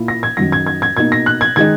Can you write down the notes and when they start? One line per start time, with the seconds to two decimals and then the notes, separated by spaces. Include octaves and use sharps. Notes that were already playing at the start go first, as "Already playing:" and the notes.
Already playing: A#2 A#3 E4
0.08 A#6
0.23 G#6
0.37 F#2 D#3 F#3 A#6
0.52 G#6
0.66 G#6
0.82 G#6
0.97 B2 A#3 D#4 G#6
1.12 A#6
1.26 F#6
1.41 G#6
1.56 D#3 G#3 D#4 G#6